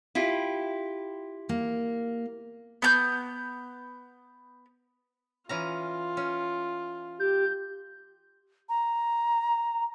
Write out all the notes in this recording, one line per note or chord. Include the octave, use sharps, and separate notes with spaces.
E4 F4 G4
A#3
B3 A5 G6
E3 C#4 F4 A#5
C#4
G4 G6
A#5